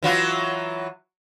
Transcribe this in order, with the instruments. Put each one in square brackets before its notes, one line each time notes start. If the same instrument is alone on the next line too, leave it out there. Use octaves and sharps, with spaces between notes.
[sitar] E3 F#3 F4